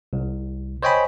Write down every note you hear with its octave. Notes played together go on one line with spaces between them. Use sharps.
C2
C5 C#5 D#5 G5 G#5 B5